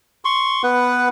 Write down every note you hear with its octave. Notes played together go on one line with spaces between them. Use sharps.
C6 C#6
B3 B4 F#5